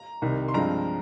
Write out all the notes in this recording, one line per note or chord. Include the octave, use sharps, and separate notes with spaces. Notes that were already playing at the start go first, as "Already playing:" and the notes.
Already playing: A#5
C2 C3 D#3
C6
G2 F3 G#3 C4 A#5